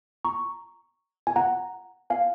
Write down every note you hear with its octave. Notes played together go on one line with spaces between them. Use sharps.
A#5 C#6
G#5
F#5 A#5
F5 G#5